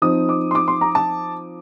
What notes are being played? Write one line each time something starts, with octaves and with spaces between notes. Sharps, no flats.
F3 C4 D#4 D#6
D6
C6
D6
C6
A#5
A5